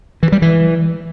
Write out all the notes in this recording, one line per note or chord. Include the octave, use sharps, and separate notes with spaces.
E3
G3
E3